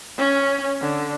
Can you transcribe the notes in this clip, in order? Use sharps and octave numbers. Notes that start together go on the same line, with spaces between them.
C#4
D3